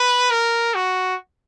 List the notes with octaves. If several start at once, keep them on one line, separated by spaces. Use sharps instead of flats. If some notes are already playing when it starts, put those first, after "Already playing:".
Already playing: B4
A#4
F#4